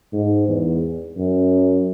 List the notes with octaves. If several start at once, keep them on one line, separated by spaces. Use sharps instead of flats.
G#2
E2
F#2